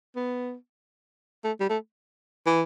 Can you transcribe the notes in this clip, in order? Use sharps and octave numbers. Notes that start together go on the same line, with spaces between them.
B3
A3
G3
A3
E3